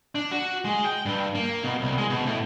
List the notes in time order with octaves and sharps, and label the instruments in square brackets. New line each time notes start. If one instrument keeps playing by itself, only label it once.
[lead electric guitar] D4
F#4
G#3
G5
G2
A#3
B2
C2
G#3
B2
A2